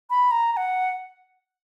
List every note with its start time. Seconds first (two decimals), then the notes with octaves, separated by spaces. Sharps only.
0.10 B5
0.31 A#5
0.52 A#5
0.57 F#5